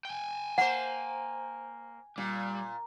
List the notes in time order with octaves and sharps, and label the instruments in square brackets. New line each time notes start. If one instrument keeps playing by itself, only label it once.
[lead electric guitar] G5 G#5
[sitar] A#3 C5 [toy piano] F#5
[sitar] A#2 [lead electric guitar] G3